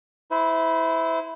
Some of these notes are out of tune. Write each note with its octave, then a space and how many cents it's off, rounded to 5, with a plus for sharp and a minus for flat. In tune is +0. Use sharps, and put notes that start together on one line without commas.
E4 -10 C5 -35